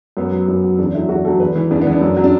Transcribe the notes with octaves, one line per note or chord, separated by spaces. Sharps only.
F#2 B3
F#3
F#2
F#3
E2 D4
D3 F#3 E4
E2 F#4
D3 F#3 A4
E2 B4
E3
E2 D4
B3
E3 D4
F#2
F#3
D4